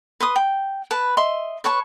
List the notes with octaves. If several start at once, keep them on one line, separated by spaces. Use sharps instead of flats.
B4 C6 D#6
G5
B4 A5
D#5 E5 C6
B4 C#5 A5 C#6